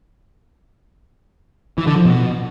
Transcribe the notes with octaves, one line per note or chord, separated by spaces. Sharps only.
E3
D3
F3
B2